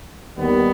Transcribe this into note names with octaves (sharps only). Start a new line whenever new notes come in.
D#2 D#3 G3 B3